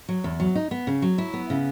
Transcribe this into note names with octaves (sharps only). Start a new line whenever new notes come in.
F#3
E2
F#3
D#4
B3
C#3
F#3
E4
B3
C#3